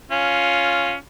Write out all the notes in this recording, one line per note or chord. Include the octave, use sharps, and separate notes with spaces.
C#4 F4